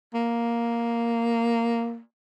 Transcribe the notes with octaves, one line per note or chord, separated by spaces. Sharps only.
A#3